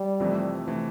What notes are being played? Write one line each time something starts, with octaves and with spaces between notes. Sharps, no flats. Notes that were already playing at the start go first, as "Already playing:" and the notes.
Already playing: G3
F1 F2 C3 E3 A3
C3 E3 A3